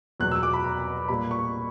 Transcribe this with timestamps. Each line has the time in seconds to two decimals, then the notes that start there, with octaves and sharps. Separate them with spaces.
0.20 E2 B2 F#3 F#6
0.31 E6
0.43 D6
0.53 B5
0.64 A#5
1.08 A#2 G3 B5
1.31 C#6